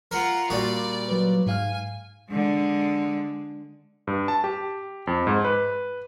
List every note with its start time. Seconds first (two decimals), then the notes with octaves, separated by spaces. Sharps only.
0.11 F4 A#4 F#5
0.50 A#2 G3 F#4 D5
1.09 F#3 B4
1.46 G#2 F5 G#5 F6
2.30 D3 G#3
4.07 G2
4.28 A5
4.44 G4
5.07 F2
5.27 G#2
5.44 B4